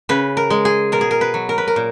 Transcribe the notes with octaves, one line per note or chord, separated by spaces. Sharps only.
C#3 B4
A#4
G#3
G#4
B2 A#4
G#4
A#4
B4
F#3
A#4
B4
A#4
A#2